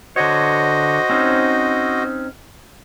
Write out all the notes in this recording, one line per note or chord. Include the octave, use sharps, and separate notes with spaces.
D3 F#4 C5 C#5 D#5
C4 C#4 D#4